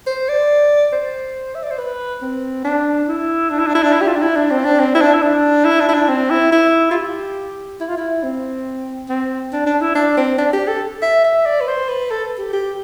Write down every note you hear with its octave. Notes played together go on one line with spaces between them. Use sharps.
C5
D5
C5
E5
D5
C5
B4
C4
D4
E4
D4
E4
D4
E4
D4
E4
G4
F4
D4
E4
D4
C4
D4
C4
E4
D4
E4
D4
E4
D4
E4
D4
C4
E4
E4
F4
G4
E4
F4
E4
C4
C4
D4
D4
E4
D4
C4
D4
G4
A4
E5
E5
D5
B4
C5
B4
A4
G4
G4